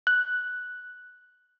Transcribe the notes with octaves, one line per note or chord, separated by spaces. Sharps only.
F#6